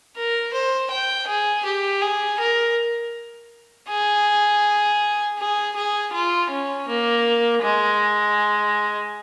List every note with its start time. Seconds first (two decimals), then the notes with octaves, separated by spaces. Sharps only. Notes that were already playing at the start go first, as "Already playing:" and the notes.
0.16 A#4
0.53 C5
0.90 G5
1.27 G#4
1.65 G4
2.02 G#4
2.39 A#4
3.89 G#4
5.38 G#4
5.76 G#4
6.13 F4
6.50 C#4
6.87 A#3
7.62 G#3